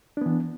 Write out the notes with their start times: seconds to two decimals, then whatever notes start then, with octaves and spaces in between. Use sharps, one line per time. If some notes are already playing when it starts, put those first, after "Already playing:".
0.17 D4
0.21 B3
0.26 E3